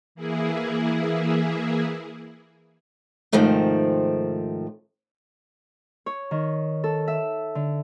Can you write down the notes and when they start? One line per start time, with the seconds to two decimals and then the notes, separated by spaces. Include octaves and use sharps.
0.15 E3 A#3 E4 G#4
3.32 G#2 C3 D#3 F3 A3 C4
6.06 C#5
6.31 D#3
6.84 A4
7.07 E5
7.55 D3